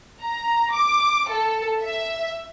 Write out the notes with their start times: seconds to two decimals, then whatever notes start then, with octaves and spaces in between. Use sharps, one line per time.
0.22 A#5
0.73 D6
1.30 A4
1.82 E5